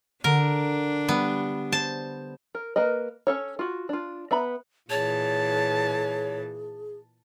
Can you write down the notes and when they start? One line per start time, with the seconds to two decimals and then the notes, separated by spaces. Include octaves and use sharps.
0.24 D3 D4 A#4
1.09 G3 B3
1.72 C5 A5
2.55 A#4
2.76 A#3 A#4 B4 D#5
3.27 C#4 A4 C#5
3.59 F4 F#4
3.89 D4 F4
4.31 B3 E5 A#5 B5
4.90 A#2 E3 G#4 C#5 A5